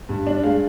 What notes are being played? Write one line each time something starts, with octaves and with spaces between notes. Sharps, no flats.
G2
D4
G#3 F5